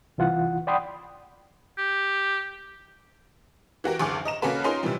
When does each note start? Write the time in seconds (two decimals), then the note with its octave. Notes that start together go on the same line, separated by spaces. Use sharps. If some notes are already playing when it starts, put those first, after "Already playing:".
0.18 C2 E3 F4 F#5
0.67 D5 F#5 G5 B5 C6 D#6
1.78 G4
3.84 E3 F#4 G4 A#4
3.99 F#1 D2 G#4 D6
4.25 D#5 A#5 E7
4.42 C#3 A#3 C#4 F#4 A4 B4
4.64 C#4 D#4 F4 G#4 A#4 C6
4.83 C3 E3 F3 G3